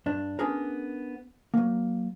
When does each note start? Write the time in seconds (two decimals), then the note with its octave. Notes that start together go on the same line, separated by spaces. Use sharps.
0.06 G2 D4
0.39 B3 C#4 D4 G#4 A#4
1.54 F#3 A#3